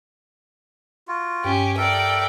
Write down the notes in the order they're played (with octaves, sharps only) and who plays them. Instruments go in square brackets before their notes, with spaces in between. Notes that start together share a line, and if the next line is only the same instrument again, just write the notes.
[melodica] F4 F#4
[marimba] G2 [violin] C#4 G4
[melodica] A4 A#4 E5 [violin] D5 G5